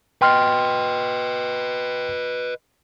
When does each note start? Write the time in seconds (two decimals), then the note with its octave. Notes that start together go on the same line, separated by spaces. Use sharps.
0.22 B4 D#5 G5 C6 F6